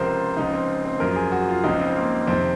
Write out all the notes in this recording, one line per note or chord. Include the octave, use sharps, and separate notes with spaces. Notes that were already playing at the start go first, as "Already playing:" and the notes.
Already playing: C#2 C3 F3 A#4 C5
C#2 C#3 F3 D#4
C4
C4
F#2 F3 A#4
G#4
F#4
F4
C#2 C#3 F3 D#4
C4
A#3
F2 C3 D#3 C4